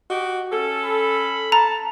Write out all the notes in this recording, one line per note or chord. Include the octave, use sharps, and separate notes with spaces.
F#4 G4 D#5
C#4 A4
B5
A5 A#5